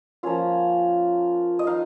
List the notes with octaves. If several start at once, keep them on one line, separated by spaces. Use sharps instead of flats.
F3 A#3 C#4 F4 F5
D#5
D#4 F5